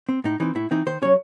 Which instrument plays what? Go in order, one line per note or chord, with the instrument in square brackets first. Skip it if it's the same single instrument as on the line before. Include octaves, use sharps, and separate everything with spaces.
[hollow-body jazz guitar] C4
A2 D#4
E3 C4 D#4
A2 E4
E3 C4 D#4
D#3 C5
F#3 C#4 C#5